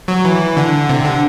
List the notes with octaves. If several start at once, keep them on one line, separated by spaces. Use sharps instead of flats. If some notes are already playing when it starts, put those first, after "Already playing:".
F#3
E3
D3
C3
D3